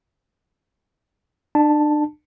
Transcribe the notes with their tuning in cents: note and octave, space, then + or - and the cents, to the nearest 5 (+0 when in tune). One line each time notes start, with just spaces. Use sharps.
D4 +35 A5 +0